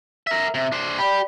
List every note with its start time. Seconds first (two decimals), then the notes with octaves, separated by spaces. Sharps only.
0.27 A#4 E5
0.54 C3
0.72 D4 C5
0.98 G4 D5 B5